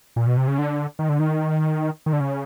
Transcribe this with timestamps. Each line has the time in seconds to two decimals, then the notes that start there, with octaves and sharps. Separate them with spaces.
0.16 A#2
0.27 B2
0.37 C3
0.48 C#3
0.59 D3
0.99 D#3
1.09 D3
1.19 D#3
2.06 D#3
2.13 D3
2.20 C#3